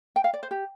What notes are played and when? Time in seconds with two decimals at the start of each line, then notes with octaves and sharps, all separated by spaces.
0.16 G5
0.24 F5
0.33 D5
0.43 C5
0.51 G4